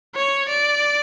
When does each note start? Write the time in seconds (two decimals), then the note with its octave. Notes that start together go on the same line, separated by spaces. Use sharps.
0.15 C#5
0.48 D5